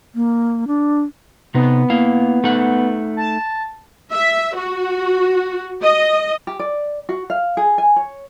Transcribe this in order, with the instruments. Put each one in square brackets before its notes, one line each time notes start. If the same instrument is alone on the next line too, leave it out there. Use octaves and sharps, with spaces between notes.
[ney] A#3
D4
[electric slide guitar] C3 D#4 [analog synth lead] B3
[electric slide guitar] A#3 E4 F5
A3 D#4 F#5
[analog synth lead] A5
[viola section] E5
F#4
D#5
[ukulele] G4
D5
F#4
F5
G#4
G#5
C#5